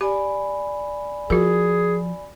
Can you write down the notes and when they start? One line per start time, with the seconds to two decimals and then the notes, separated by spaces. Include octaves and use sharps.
0.01 G4 D5 G#5 B5
1.30 F3 F#4 G#4 A#4